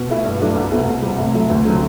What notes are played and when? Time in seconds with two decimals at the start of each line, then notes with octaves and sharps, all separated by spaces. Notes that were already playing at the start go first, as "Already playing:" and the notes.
Already playing: B2
0.09 A3 E4
0.24 G2
0.40 F#3 A3 D4
0.56 C2
0.71 B2 A3 C4 E4
0.87 C2
1.02 C3 G3
1.18 A2
1.34 F#3 A3 E4
1.50 D2
1.65 D3 F#3 C4